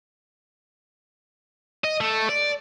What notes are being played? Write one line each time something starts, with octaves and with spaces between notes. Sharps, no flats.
D#5
A3
D5